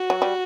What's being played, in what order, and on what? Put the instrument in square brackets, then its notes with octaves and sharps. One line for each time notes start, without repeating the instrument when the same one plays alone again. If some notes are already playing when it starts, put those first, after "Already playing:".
Already playing: [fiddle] F#4
[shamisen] F#3
G3